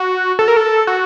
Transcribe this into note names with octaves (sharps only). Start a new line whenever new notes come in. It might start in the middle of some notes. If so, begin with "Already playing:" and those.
Already playing: F#4
A4
A#4
A4
F#4